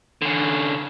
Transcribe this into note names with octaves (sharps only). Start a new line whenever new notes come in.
D3 C#4